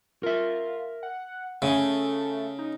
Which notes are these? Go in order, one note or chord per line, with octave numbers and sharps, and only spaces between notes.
F4 A#4 E5
F#5
C#3 A3 E5 G#5
D#4